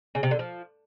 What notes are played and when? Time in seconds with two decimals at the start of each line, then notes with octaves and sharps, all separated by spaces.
0.15 C#3
0.23 C3
0.31 D3
0.39 F3